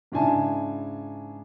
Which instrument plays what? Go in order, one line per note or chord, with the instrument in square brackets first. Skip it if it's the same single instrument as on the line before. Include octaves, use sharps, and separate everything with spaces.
[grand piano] G#2 C#3 D4 E4 G#5 A5